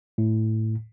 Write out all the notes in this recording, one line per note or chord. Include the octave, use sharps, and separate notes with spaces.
A2